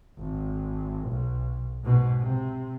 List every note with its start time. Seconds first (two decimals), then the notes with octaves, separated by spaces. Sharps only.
0.19 G#1
1.09 B1
1.83 G#2 B2
2.19 C3